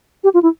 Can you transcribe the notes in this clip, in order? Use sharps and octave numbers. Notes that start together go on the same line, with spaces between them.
G4
F4
E4